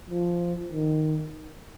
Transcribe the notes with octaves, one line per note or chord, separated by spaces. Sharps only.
F3
D#3